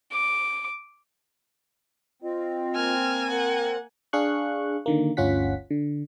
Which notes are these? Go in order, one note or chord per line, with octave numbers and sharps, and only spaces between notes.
D6
C4 F4 D#5
A#3 G#5 F6
A#4 F#5
D4 G#4 F5 C#6 F#6
D3 D#3 A#3
G1 D2 C#4 F4 F#5 B6
D3